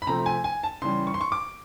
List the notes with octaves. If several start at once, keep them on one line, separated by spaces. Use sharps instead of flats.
B5
C3 F3 A3 C4 A#5
G#5
G#5
A5
C#3 E3 G3 C6
C#6
C6
C#6
D6